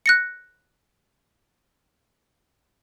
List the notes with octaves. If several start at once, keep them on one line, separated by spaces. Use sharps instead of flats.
F#6 A#6 C#7